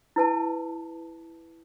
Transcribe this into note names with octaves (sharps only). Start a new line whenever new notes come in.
E4 B4 A5